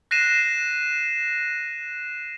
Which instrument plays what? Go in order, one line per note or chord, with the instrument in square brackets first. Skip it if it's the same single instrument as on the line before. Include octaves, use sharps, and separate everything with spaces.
[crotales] F#6 A#6 C7 D#7 E7